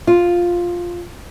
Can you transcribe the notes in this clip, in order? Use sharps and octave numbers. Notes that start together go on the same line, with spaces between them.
F4